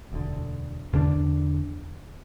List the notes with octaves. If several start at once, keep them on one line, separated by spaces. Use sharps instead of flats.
E1 D2 D3
E2 D3 A3 D4